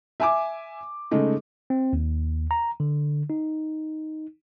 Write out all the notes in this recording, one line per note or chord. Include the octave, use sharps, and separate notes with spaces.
E5 G#5 D6
C#3 G#3 A3 D#4
C4
D#2
A#5
D3
D#4